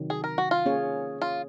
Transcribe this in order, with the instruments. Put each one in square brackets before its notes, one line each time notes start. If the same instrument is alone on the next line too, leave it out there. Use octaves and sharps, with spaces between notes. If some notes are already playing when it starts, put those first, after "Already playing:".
Already playing: [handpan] C3 D#3 F#3
[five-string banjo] G#4
A#4
F#4
F4
[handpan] A#3 C#4 G#4 C#5
[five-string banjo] F4